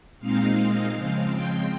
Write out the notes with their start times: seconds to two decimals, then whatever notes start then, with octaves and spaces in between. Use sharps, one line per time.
0.19 A#2 G#3 C4 D#4 F5
0.93 C#3 F3 G#3 C4 F5
1.29 G5